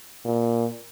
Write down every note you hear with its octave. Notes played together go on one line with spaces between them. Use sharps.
A#2